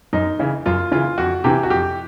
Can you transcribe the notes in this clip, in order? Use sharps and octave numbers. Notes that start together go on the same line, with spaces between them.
F#2 D#4
C#3 E3
F#2 F4
C#3 E3 F4
F2 F#4
C3 E3 G4
F#4
F2 G4